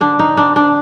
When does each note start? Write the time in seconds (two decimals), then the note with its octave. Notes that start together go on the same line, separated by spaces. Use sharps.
0.01 D3 D4
0.19 D#4
0.37 C4 D4
0.56 D4